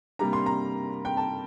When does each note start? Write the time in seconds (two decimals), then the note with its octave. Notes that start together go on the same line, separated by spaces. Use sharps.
0.19 C3 G3 A#3 D4 A#5
0.33 C6
0.46 A#5
1.05 G5
1.17 A5